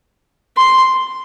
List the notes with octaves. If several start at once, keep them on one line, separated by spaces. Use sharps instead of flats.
C6